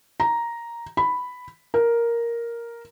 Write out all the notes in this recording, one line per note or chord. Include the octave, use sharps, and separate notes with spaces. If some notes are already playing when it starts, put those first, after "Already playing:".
A#5
B5
A#4